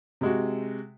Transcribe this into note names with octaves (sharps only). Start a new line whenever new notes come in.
C3 G#3 F#4